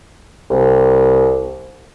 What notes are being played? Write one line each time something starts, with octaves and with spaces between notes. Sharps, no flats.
C2